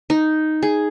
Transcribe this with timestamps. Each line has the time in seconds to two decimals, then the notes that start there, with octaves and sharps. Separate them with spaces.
0.10 D#4
0.63 G#4